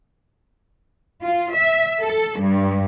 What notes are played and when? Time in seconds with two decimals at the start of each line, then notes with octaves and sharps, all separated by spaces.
1.23 F4
1.54 E5
2.02 A4
2.39 G2